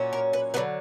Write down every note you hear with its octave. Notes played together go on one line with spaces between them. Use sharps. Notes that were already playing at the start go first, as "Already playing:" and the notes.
Already playing: A#2 F#3 C#4
A#4
B4
D3 F#3 B3 B4